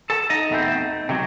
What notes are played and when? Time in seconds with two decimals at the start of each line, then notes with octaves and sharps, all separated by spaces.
0.10 A4 A5
0.30 D#4 D#5
0.50 E2 B2 A3 C4
1.09 C3 F#3